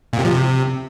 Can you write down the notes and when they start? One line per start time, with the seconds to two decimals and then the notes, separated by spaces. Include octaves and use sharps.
0.13 A#2
0.19 C3
0.25 F3
0.31 C3